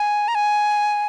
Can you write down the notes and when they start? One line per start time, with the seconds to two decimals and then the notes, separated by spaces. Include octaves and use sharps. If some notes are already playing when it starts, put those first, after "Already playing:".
Already playing: G#5
0.28 A#5
0.35 G#5